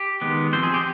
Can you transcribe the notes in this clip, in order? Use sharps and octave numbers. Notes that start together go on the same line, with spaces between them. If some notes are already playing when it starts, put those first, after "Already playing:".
Already playing: G4
D#3 G#3 B3
F3 C4 C5
G#4
G4